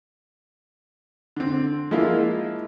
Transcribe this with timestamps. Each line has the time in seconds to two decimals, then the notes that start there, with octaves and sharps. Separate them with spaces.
1.36 D3 C4
1.91 F3 G#3 A#3 E4 F4